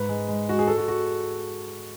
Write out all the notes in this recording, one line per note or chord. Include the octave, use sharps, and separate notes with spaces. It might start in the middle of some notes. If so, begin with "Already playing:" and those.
Already playing: G#2 B4
G#3
G#3
G#3 F#4
G#4
G#3 A4
F#4
F#4